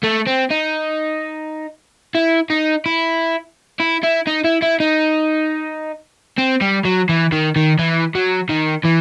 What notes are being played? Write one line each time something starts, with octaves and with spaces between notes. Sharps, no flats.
A3
C4
D#4
E4
D#4
E4
E4
E4
D#4
E4
E4
D#4
C4
G3
F#3
E3
D#3
D#3
E3
F#3
D#3
E3